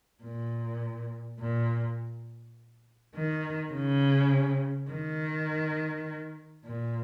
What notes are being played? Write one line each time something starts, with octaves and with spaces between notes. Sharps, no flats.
A#2
A#2
D#3
C#3
D#3
A#2